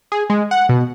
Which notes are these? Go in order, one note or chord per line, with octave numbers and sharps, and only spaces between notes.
G#4
G#3
F#5
B2